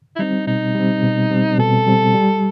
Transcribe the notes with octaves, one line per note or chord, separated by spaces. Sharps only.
E4
G3 C4 D#4
B2 D#4
G3 C4
B2
G3 C4
B2 A4
G3 C4
G3